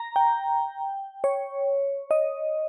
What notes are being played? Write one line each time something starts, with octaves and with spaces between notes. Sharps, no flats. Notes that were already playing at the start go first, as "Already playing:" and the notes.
Already playing: A#5
G5
C#5
D#5